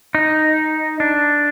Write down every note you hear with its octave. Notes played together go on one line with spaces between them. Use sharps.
D#4
D4